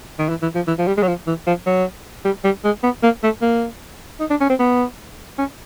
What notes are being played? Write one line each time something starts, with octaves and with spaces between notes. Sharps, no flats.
D#3
E3
E3
F3
E3
F3
G3
G#3
F#3
F3
E3
F3
F#3
G3
G3
G#3
B3
A#3
A3
A#3
D#4
D4
C#4
C4
B3
C#4